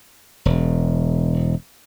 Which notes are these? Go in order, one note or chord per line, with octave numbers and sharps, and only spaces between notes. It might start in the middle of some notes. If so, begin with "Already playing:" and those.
E1